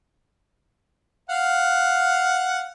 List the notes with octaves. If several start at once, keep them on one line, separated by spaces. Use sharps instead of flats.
F5 F#5